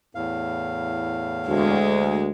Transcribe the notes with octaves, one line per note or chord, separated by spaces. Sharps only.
E2 A2 F5
D2 G#3